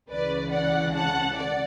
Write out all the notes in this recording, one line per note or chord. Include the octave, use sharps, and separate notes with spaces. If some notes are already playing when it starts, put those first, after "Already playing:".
C#2 C#3 E3 B4 D5
D5 F#5
F#5 A5
D5 F#5